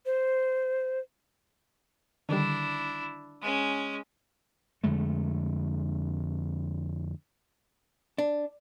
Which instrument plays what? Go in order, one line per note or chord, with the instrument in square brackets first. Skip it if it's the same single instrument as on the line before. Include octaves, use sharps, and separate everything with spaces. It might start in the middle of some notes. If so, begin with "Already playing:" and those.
[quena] C5
[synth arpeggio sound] D3 D#3 G3 [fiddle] D4 E4
[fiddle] G#3 C#4
[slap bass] F2 D3 G#3 A3
[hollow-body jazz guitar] D4